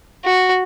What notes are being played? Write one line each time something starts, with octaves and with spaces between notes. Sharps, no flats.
F#4